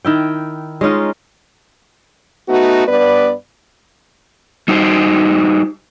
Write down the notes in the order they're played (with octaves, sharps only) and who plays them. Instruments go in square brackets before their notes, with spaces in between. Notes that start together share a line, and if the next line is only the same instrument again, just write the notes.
[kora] D#3 E4 G5
G#3 C#4 D#4 F4
[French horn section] A3 B3 D#4 F#4
G2 B3 B4 D5
[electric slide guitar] G3 D#4 F#4 C5